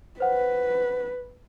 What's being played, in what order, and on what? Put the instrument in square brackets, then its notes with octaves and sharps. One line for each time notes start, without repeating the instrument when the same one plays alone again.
[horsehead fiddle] B4 [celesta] C5 F#5